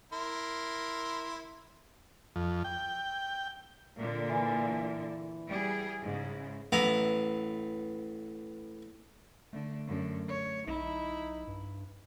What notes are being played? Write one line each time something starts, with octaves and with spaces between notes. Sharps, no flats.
E4 A#4 C6
F2
G5
A#2 D3
E3
G3 G#4
G#2 C#3
A1 B3 E4 A#5
D3 A3
F#2 D3
C#5
B1 D#4 E4
G2